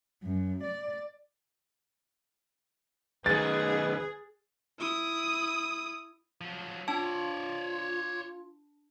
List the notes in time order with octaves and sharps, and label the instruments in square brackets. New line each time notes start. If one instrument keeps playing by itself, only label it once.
[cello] F#2
D5
[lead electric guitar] F#2 D#3 [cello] G#4 [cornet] B4 [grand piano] A6
[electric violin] E4 D#6
[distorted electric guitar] F3 F#3
[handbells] D4 A5 [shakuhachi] F4 [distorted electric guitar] C#5 D5